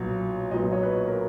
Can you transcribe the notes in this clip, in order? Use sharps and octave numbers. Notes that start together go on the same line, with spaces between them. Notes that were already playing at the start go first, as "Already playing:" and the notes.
Already playing: B1 A#2 F#3 B3
B1 A#2 F#3 B3 D#5
C#5
B4
A#4